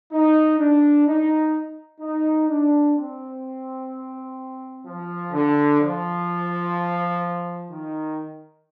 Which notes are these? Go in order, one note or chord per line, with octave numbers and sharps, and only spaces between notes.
D#4
D4
D#4
D#4
D4
C4
F3
D3
F3
D#3